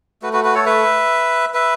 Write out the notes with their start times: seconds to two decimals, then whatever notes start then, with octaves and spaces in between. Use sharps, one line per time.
0.22 A3 F#4 B4
0.33 F#4 B4
0.44 F#4 B4
0.55 A4 C#5
0.66 B4 E5
1.54 B4 E5